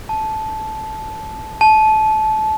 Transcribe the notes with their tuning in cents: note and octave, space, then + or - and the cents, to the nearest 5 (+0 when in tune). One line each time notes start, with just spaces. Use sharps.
A5 -15
A5 -25